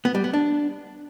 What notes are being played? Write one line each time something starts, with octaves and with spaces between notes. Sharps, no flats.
B3
G3
B3
D4